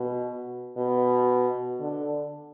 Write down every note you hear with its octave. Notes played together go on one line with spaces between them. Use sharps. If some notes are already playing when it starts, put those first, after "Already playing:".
Already playing: B2
B2
D3